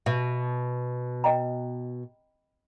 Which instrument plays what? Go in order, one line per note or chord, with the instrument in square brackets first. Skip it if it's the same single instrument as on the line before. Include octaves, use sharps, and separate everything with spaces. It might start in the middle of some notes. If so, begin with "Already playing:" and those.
[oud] B2 [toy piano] E5
[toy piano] D#5 G5 A#5